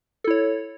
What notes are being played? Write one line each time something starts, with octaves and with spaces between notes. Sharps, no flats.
E4 A4 C#5